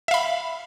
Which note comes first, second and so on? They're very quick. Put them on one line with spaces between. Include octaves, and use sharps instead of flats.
E5 F5 B5